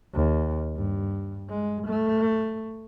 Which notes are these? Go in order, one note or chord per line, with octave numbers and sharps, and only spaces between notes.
D#2
G2
G#3
A3